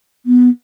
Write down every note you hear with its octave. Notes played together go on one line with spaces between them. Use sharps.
B3